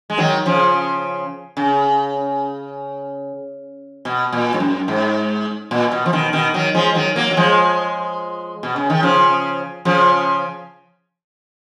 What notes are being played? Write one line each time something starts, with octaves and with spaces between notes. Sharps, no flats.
G#3
D#3 F#3
C#3 F3
C#3
B2
A#2
G#2
F#2
G#2
A#2
B2
F3
B2 D#3
B2 D#3
D#3 F#3
F3 G#3
D#3 F#3
F#3 A#3
F#3
F3 G#3
B2
C#3
D#3
C#3 F3
C#3 F3